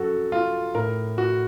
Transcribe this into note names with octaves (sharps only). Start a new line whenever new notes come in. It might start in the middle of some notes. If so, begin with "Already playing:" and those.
Already playing: F#2 F#4 A4
F4
A2 A#4
F#4